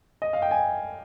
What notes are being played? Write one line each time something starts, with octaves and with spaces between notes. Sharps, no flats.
D#5
F5
G5
G#5